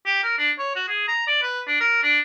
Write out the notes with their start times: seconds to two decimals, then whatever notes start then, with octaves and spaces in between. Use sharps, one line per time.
0.06 G4
0.23 A#4
0.38 D4
0.58 C#5
0.76 F#4
0.88 G#4
1.08 A#5
1.27 D5
1.42 B4
1.67 D4
1.80 A#4
2.03 D4